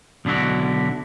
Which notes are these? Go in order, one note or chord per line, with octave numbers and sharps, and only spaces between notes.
B1 D3 D4 E4 F#4